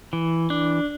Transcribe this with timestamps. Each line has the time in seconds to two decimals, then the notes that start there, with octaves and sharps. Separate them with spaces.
0.13 E3
0.50 D4